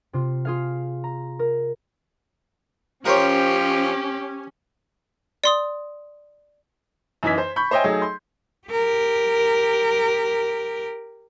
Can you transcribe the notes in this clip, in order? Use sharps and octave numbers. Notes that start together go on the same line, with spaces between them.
C3 F4
F4 G#4 F5
A#5
A#4
F3 C#4 G4 A#4 C5 C#5
D5 C6 D#6
F#2 E3 D#4 G#6 B6
C5
B5 C#6 G6
C5 C#5 D#5 E5 G5 G#5
F#3 A3 D#4 G#4
C6
G4 A#4